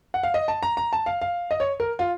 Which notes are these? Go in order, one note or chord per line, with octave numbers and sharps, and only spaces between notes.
F#5
F5
D#5
A5
A#5
A#5
A5
F5
F5
D#5
C#5
A#4
F4